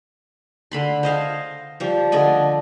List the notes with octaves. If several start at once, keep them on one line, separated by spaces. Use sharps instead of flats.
D3 B5 C6
C5 D#5 F5 G#5
F3 G3
D3 D5 D#5 G#5